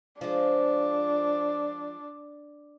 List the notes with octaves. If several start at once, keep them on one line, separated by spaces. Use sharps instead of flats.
F3 G#3 D4